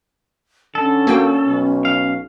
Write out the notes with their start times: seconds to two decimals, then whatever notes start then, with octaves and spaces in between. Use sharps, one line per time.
0.75 D3 C#4 A4
1.07 A#3 F#4 G5
1.46 B1
1.85 F5